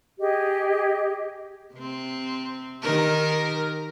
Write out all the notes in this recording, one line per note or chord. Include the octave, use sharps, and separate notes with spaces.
G4 G#4 D#5
C3 C4
D#3 G4 A#4